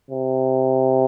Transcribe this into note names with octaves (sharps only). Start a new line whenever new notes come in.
C3